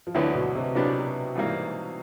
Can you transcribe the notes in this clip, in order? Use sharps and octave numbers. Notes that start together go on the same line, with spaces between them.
F3
D2 D3 E3 F#3 B3 E4
B2
C3
A#2 F#3 B3 D4 G4
G#2 E3 G3 A#3